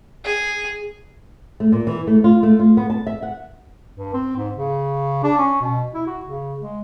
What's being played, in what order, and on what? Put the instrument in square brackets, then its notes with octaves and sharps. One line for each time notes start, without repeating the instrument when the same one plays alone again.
[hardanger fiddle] G#4
[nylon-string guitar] A3
A#2
E3
A3
F4
A3
F4
B3
A5
E5
F#5
[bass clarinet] G2
C4
G#2
C#3
D4
C#4
B2
E4
F#4
C#3
G#3